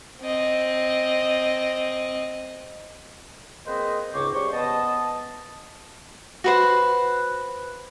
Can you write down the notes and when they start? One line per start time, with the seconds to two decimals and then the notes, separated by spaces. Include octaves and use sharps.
0.22 C4 D#5
3.66 A#3 C4 G#4 B4 C5 D#5
4.14 C#2 G#2 C#3 C5 C#5 D6
4.34 C#3 G3 C5 C6 C#6
4.53 B3 D#5 A5
6.44 F#4 B4 C5